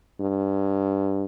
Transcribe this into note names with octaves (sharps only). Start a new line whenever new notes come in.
G2